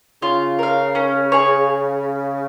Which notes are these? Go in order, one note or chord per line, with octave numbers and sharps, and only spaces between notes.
C#3 F4
A#4 F5
C#4
G#4 C#5